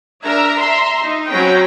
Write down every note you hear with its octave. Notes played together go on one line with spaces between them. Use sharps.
D4 A#4 E5 A#5
E5 A#5 C6
D#4
F#3 C4 C#4 G5 A#5 B5